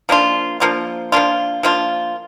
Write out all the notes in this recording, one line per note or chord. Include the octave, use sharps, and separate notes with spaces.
F3 A#3 D4 F4
F3 A#3 D4 F4
F3 A#3 D4 F4
F3 A#3 D4 F4